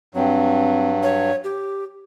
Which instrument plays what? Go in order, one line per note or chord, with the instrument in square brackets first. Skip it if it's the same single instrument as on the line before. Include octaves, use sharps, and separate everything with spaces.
[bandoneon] G2 F#3 [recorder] C4
[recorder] C#5
G4